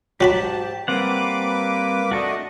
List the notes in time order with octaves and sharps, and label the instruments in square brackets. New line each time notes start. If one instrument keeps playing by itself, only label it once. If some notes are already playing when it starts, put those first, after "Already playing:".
[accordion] G#2 A5 [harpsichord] F#3 F#4 B5 [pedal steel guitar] G4
[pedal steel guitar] G3 C4 F#5 [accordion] A#3 B4 D6
[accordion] A3 D4 D#5 [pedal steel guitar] F#4 A4